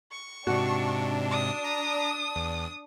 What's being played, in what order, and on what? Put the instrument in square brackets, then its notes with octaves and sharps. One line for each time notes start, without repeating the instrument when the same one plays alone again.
[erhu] C#6
[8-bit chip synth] G#2 C3 [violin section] D4 [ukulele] F#4
[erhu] D#6
[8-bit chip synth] A#5
E2